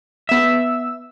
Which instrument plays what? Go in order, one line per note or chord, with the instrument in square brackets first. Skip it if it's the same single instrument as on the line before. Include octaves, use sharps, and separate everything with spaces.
[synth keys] B3 E6 [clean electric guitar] E5